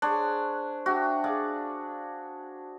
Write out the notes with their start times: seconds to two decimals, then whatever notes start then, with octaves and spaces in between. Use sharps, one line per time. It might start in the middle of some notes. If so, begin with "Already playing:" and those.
0.02 D4 G#4 C5 C#5
0.86 D4 F#4 E5 G5
1.24 G#4 D5 F5